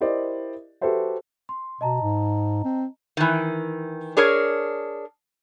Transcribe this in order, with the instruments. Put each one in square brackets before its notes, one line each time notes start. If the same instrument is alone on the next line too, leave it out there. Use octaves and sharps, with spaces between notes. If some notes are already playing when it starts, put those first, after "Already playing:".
[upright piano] E4 G4 A#4 C5 D5 D#5
F#4 G4 A4 B4 C5 E5
[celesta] C6
[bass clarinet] B2 [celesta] D#5 A5 A#5
[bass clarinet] G#2
C4
[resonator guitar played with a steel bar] D#3 E3
D4 G#4 A#4 C#5